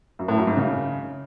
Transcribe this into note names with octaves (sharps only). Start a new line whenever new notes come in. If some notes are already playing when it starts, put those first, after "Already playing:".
F#2
A2
F#2
G#2
C#3